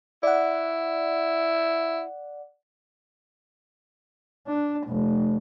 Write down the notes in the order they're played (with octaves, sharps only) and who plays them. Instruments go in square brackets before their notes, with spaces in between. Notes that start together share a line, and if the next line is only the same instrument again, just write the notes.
[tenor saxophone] E4 [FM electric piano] D5 F#5
[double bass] D4
F1